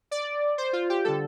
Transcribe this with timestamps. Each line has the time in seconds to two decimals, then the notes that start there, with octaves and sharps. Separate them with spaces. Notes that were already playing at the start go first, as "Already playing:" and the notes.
0.11 D5
0.58 C5
0.73 F4
0.90 G4
1.04 D3 G3 A4